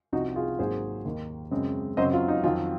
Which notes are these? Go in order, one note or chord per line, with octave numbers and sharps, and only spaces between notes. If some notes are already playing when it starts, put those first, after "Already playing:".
C2 C3 F3 C4 D#4 F#4
F4 G#4
G#1 G#2 F#3 A#3 G#4 C5
D#2 D#3 A#3
F#2 C#3 G#3 C4
F#2 C#3 F#3 C4 C5 D#5
F4
D#4
F2 D#3 F#3 C4 F4